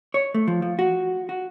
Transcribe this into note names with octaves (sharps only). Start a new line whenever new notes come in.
C#5
A3
F3
F3
F#4
F#4